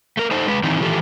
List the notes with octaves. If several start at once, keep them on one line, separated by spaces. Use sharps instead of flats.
A3 A#4
D#4 A4 C5
G#3 B4
D#3 E3 C4 D#4 E4
D#3 E3 F4 G4 A4